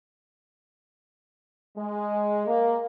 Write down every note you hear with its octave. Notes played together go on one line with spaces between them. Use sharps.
G#3
A#3